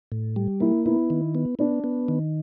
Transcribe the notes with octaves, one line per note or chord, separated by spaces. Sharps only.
A2
G3
A#3 E4
B3 E4
D#3
B3
B3 D4
B3
D#3